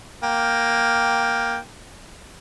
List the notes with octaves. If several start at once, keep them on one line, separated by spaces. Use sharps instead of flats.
A#3 G5